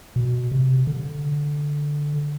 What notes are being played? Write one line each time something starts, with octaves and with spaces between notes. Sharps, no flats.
B2
C3
D3